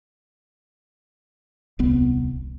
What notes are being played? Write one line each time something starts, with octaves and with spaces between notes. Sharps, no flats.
D#1 C2 B3